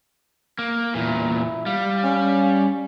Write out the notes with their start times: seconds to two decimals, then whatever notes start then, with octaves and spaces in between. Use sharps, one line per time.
0.59 A#3
0.95 E2 A#2 E4
1.66 G3 F5
2.03 C#4